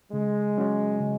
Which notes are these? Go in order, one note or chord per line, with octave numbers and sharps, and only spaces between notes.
C#3 G#3
F#3 C#4 F#4 C#5
C#3